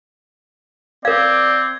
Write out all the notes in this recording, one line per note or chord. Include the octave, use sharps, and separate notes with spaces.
C4 A#4 D5 F5 G#6